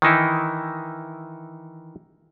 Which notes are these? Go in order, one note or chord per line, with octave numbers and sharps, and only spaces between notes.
D#3 E3 D#4 E4